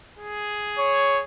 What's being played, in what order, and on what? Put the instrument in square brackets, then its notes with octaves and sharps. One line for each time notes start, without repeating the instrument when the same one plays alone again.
[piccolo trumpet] G#4
[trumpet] C#5